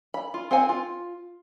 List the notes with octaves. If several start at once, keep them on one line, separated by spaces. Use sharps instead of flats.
B5
F4
C4 C5 F#5 G#5
F4